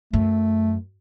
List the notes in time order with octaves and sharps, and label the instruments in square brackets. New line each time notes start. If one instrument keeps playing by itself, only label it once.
[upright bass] F#2 [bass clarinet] A3